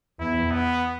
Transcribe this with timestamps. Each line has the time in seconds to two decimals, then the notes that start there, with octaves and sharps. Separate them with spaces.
0.19 E2 E4
0.51 B3